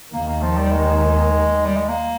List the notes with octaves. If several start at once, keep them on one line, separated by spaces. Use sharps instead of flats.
D#2 D#3 A#3
A#3
F3
G3
G#3
G3
G#3
A#3